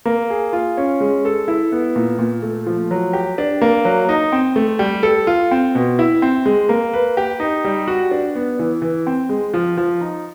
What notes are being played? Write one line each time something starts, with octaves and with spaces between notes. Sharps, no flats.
A#3
G#4
F4
C#4
G#3
A4
E4
B3
A#2
A#2
A3
F3
F#3
G4
D4
A#3
F#3
D#4
C4
A3
G3
A4
F4
C4
B2
E4
C4
G#3
A#3
B4
G4
D#4
G3
F#4
D4
B3
E3
E3
C4
G#3
F3
F3
D#4